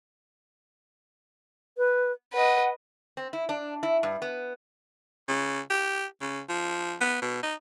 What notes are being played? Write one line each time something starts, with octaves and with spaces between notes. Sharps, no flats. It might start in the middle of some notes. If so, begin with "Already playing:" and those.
B4
B4 D#5 F#5
C4
E4
D4
E4
G2
B3
C#3
G4
C#3
F3
B3
B2
D#4